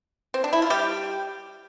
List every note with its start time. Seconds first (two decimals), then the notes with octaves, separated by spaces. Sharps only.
0.34 C4
0.44 D4
0.53 E4
0.62 F4
0.70 G3 G4